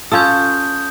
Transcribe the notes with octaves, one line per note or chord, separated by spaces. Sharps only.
C#4 F4 A4 D#6 G6